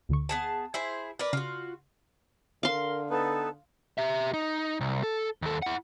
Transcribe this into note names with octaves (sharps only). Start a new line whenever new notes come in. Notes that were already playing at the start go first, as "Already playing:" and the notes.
D2 D3 C#6
B3 G#4 A5
E4 G#4 C5
A#4 B4 D5
C#3 F4 F#4
D3 A#4 F5 C6
B3 D#4 A4 B4 A5
G4 E5
D#4
C2
A4
D#2 A4
E4 F#5